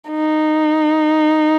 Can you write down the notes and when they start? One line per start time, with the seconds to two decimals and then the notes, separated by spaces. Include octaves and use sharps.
0.10 D#4